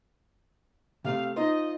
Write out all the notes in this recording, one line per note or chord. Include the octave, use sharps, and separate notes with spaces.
C3 A3 C4 F5
D#4 F4 C5 D#5